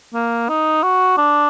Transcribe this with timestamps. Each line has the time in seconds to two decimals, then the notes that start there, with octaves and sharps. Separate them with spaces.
0.14 A#3
0.49 D#4
0.83 F#4
1.18 D4